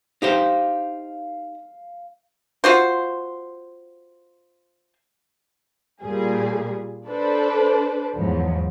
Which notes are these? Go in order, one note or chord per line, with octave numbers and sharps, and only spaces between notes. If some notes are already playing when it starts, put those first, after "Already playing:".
D#4 G4 C5 F5
F4 F#4 C5
A#2 G3 G#4
D4 A4 B4 C5
E2 G#2 F3 F#3